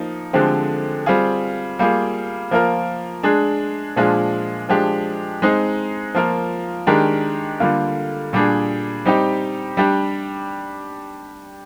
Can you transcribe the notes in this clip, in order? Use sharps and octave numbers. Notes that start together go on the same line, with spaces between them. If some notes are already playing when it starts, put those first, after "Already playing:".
Already playing: F3 A#3 D#4
D3 F3 G#3 C4 G4
G3 C4 F4 G#4
G3 A#3 F4 G#4
F3 A#3 F4 A#4
G#3 D4 G#4
A#2 F3 G#3 D4 F4
F3 G#3 D4 G4
G#3 C4 D#4 G#4
F3 A#3 F4 A#4
D#3 G#3 D4 G4 A#4
D3 G3 A#3 F4
A#2 G3 D4 G#4
G3 C4 D#4 G4
G3 D4 G4